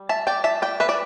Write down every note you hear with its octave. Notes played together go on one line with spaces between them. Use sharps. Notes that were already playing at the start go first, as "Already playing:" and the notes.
Already playing: G3
E5 A5
D5 G5
E5 A5
D5 G5
B4 E5
D5